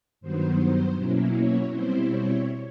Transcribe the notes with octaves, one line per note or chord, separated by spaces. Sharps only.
G2 D#3 F#3 B3 C5
C5
B2 F#3 A#3 C#4 E4
C#5
B2 G3 C4 E4 C5
C#5